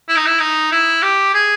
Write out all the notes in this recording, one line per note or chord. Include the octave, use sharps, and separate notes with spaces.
E4
D#4
E4
D#4
E4
G4
G#4